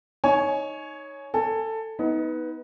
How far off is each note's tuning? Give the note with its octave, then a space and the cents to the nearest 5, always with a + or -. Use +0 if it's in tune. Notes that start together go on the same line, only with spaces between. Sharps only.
D#4 +0 C#5 +0 G#5 +25
A4 +15 G#5 +0
B3 +0 D#4 +30 B4 +0